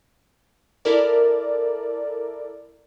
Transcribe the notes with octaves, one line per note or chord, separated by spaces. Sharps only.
E4 A4 A#4 D5